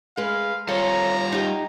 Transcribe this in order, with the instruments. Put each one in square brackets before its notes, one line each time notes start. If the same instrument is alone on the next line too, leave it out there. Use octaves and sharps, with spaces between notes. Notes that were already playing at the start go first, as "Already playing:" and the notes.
[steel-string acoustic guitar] G#3 B4 [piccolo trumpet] F5
[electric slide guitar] G3 F4 F5 [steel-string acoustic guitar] C4 A4 C#5 [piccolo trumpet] A#5
[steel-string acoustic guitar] D#4 G4